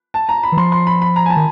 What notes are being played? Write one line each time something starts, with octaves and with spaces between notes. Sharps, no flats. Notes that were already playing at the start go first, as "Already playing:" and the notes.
A5
A#5
B5
E3
F3 C6
C6
B5
B5
A#5
G#5
A5
D#3